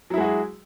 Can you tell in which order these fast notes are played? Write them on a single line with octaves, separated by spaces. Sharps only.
F#3 E4 G#3 F#4 G#4